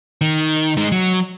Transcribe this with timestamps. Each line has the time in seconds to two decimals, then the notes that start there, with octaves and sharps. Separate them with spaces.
0.21 D#3
0.77 G#3 D#4
0.92 F#3